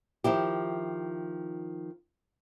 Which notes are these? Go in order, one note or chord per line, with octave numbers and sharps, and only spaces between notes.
D#3 F3 E4 G4